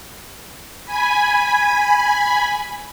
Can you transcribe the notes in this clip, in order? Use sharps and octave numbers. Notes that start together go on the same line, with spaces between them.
G#5 B5